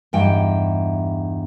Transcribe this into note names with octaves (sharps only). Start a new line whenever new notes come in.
E2 G2 D#4 E4 G5